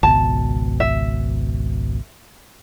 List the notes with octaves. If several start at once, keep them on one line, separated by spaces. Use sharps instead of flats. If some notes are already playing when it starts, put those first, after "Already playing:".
G#1 C#2 B2 A5
E5